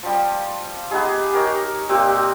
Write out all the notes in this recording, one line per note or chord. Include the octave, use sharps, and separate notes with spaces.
F3 G3
B3 D#4 G4 G#4
A#4 C#5 D#5
A#2 C4 G4